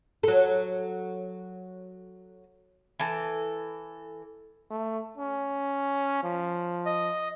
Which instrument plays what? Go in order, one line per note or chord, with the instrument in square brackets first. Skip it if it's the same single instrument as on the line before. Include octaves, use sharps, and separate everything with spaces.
[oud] F#3 A4
[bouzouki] E3 A4
[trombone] A3
C#4
F3
[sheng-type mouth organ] D#5